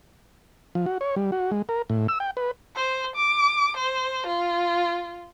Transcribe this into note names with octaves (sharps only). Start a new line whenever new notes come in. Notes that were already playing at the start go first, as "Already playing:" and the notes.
F3
F#4
C#5
G3
F#4
G#3
A#4
A2
E6
G5
B4
C5
D6
C5
F4